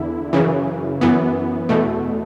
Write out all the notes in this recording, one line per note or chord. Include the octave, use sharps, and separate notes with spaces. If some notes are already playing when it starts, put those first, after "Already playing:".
Already playing: E2 D3 E4
F#2 C#3 E3
F#2 E3 B3
E2 B2 A3